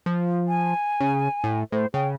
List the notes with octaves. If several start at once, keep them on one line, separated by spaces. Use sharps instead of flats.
F3
G#5
C#3
A2
A2 C5
C#3 G5